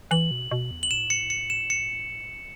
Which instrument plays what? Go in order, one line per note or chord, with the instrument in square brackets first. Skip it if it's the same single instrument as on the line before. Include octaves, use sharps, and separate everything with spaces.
[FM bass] E3 [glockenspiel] F#7
[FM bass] B2
B2
E2
[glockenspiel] F#7
[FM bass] A2 [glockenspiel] E7
[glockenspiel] C#7
C#7
E7
C#7